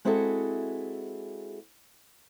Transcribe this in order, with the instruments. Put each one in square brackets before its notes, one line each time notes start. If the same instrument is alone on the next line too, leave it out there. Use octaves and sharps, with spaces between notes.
[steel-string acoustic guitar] G#3 C4 E4 F#4 G#4 A4